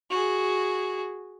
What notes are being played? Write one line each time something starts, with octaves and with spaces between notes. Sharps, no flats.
F#4 G#4